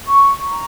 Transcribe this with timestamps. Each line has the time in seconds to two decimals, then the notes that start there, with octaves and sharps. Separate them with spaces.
0.06 C#6
0.44 A#5